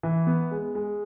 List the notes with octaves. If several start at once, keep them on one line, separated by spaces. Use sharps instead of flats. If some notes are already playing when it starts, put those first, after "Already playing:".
E3
B3
G#3
G#3